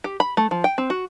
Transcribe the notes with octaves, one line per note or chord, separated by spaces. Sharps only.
G4
B5
A3
F3
G5
C4
F#4